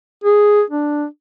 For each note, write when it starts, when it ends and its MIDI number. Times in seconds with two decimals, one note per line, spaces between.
0.24 0.62 68
0.70 1.06 62